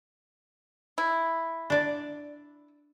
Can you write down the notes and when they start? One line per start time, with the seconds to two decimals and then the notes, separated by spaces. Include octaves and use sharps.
0.98 E4
1.70 D4 D5